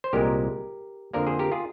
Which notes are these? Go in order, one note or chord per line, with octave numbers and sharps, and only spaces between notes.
C5
C2 A#2 G#3 G4 A#4
F2 D3 F3 A#3 A#4 D5
G#4 C5
G4 A#4
F4 G#4